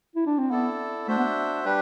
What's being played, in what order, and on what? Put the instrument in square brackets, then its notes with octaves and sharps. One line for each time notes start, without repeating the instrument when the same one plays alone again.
[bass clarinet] E4
D4
C4
[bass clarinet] B3 [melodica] E4 A4 D5
[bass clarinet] A3 [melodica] D4 F#4 C5 E5
[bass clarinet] B3
[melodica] G3 D4 G4 B4